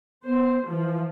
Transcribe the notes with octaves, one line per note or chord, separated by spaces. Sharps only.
B3 C5
E3 F3